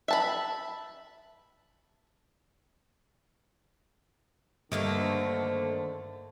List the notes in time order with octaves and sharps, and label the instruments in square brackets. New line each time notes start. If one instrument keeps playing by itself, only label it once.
[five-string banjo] E5 A5 B5
[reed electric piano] G2 [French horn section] D3 C5 [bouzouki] D#3 A3 A#3